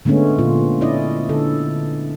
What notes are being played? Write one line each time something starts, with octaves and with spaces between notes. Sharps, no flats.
D3 G#3 A3 B3 C#4
A#2 F4
C#4 E4 D5 D#5
D3 A4